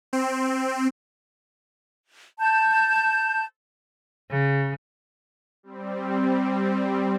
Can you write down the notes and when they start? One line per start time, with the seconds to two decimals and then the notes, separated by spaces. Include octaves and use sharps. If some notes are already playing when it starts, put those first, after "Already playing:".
0.13 C4
2.39 A5 G6
4.30 C#3
5.63 G3 C4